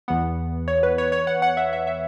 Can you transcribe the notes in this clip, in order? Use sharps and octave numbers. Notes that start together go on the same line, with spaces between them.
E2 E3 B3 F#5
C#5
B4
C#5
C#5
F#5
F#5
E5
E5
E5